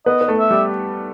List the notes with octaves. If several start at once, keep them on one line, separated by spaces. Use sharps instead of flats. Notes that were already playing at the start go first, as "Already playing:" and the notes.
B3 B4 D#5
B4
A3 A4
E5
G3 G4